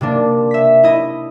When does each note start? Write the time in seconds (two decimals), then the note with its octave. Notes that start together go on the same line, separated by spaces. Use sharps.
0.01 C3 A#3 D4
0.51 E5 B6
0.83 E4 D#5